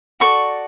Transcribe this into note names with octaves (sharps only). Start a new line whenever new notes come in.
F#4 A4 D5 C#6